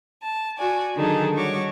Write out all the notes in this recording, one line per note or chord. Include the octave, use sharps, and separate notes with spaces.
A5
F#4 D5 G#5
D3 D#3 F#3 D#4 G#4 A4
G3 F#4 C#5 C#6 D6